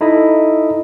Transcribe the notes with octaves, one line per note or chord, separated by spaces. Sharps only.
D#4 E4 A4 D#5